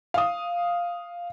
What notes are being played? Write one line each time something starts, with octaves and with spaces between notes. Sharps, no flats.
F5 D#6